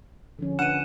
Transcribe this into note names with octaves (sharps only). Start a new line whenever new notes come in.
D3 F3 C#4
D4 B4 F#5 D#7 E7